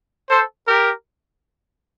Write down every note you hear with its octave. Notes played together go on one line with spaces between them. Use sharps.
A4 C5
G4 A#4